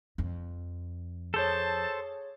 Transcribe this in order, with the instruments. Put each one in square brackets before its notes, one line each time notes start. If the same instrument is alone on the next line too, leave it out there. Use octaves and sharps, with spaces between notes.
[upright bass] F2
[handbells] G#4 C#5 [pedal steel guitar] A4 C5 [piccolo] A5